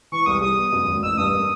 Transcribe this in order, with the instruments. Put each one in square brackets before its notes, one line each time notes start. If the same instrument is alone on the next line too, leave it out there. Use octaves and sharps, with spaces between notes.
[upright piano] E3 [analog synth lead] C#6
[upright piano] C2 [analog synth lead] D#6
[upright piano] G3 [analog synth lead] D#6
[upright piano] B3
F#2
G#1
[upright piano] A1 [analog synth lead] E6
[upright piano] G2 [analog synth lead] D#6
[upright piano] A#3